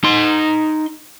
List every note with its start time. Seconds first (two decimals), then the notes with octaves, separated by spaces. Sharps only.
0.04 D#4 C6